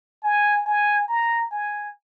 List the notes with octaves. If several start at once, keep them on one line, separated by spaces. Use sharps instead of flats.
G#5
G#5
A#5
G#5